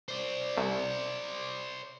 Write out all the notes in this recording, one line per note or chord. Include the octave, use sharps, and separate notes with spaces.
C5 D5
C2